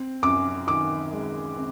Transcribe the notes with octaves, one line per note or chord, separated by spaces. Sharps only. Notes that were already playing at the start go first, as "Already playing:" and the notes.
Already playing: C4
F#2 D6
D#3 D6
G#3
C4